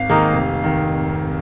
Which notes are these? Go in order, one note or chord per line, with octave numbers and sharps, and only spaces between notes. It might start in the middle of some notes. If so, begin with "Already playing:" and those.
Already playing: G#1 F5
G#2 D#3 A#3 D#4
F1
D#3